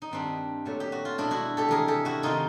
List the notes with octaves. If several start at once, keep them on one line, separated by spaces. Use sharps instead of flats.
D#4
G2 D#3 G3 C4 D4
A#2 F#3 A3
G4
F#4
F4
B2 G#3 D4 E4
E4 F#4
G4 A4
C3 E3 A3 G#4 A#4
G4 A4
E4 F#4
C3 D#3 G#3 D#4 F4